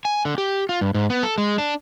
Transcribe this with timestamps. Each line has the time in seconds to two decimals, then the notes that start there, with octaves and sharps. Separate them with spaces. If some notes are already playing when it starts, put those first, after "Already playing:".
0.05 G#5
0.25 D3
0.38 G4
0.69 F4
0.81 G2
0.94 G#2
1.10 B3
1.23 A4
1.38 G#3
1.58 D4